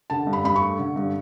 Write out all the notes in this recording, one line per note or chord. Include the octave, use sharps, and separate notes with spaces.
D3 A5
G2
B5
G2 B5
C#6
A3
D3
G2